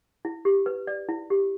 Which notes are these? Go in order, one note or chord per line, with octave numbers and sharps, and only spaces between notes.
E4
G4
B4
D5
E4
G4